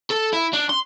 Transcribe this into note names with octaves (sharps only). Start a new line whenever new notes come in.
A4
E4
D4
C6